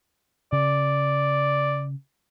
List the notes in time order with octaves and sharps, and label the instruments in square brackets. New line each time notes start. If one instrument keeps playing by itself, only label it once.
[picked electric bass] C#3 [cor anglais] D5